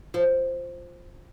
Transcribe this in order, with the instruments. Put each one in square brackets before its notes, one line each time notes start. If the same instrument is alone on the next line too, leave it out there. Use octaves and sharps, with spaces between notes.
[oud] F3